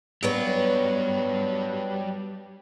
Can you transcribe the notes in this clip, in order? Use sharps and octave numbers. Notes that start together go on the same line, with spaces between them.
F#3 G3 B3 D4 C#5